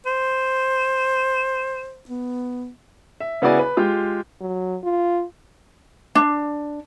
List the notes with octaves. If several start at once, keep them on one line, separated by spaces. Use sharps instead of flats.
C5
B3
E5
C#3 B3 E4 F#4 D5 G#5
B4
G#3 F4 G4
F#3
F4
D4